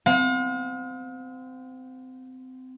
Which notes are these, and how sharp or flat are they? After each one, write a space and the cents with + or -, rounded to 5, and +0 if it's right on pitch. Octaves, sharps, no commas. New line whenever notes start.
C4 -25 F5 +45